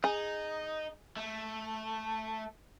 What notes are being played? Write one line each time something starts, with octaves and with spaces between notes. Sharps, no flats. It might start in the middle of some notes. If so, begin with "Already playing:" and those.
D#4 G#4
A3